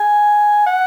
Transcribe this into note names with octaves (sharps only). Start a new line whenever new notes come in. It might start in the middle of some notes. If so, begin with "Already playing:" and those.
Already playing: G#5
F#5